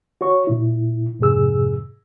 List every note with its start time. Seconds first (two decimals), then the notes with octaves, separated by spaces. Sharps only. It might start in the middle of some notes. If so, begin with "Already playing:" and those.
0.21 F#4 C#5 C#6
0.47 A#2 E4
1.19 F2 G#2 C3 G#4 E6